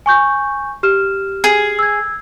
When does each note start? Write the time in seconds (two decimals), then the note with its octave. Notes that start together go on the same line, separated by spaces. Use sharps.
0.06 G#5 C#6 G6
0.83 G4 F6 E7
1.44 G#4
1.79 E6 G#6